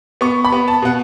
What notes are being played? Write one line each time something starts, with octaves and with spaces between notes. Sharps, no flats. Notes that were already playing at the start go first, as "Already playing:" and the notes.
B3 C#6
B5
B3
A5
B2 F#5